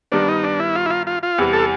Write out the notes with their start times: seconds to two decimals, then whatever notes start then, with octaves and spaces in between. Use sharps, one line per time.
0.12 G2 D#3 G3 B3 D4
0.28 D#4
0.43 D4
0.59 E4
0.75 F4
0.86 E4
0.90 F4
1.07 F4
1.23 F4
1.38 E2 C3 E3 G3
1.53 A4